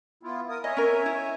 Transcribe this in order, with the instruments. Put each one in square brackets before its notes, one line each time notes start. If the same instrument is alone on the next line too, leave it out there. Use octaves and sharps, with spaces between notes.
[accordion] B3 E4 F4
A#4 D#6
[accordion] C#5 E5 G#5 [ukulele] D#5
[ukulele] C#4 A#4
E4